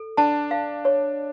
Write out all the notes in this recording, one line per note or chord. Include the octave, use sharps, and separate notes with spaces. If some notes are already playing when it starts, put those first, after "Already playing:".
Already playing: A4
D4 A5
F5
C#5